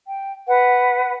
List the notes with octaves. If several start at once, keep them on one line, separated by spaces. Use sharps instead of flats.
G5
B4 F#5